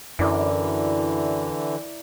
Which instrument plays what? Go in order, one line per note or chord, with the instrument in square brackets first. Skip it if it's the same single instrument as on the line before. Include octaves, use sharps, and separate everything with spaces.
[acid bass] F#2 [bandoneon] D3 E3 [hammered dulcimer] E4 A#4 D5